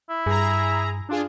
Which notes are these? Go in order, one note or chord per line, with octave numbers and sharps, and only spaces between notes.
E4
G2 G#4 A#5
D4 F4 G#4